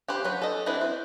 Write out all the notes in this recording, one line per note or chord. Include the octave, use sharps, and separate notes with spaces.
G4 B4 C5
F#3 B4
A4 D#5
C4 D4 E4 B4
C5